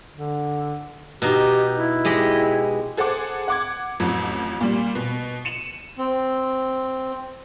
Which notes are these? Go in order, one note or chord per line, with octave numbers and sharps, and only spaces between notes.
D3
B2 D#4 G4
E4
G#3 G4 D#5
G#4 A4 C5 F#5 D6
F#5 D6 G#6
A1 F2 F#3
A#2 G3
B2
C#7 D#7 E7 F#7
C4